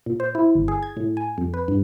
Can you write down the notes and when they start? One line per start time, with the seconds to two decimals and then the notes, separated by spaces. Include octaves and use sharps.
0.06 A#2
0.20 C5
0.35 E4
0.55 G1
0.68 G#4
0.83 G#6
0.97 A2
1.17 G#5
1.38 F2
1.54 B4
1.68 G2